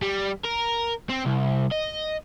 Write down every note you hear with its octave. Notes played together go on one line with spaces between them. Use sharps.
G3
A#4
C4
C2
D#5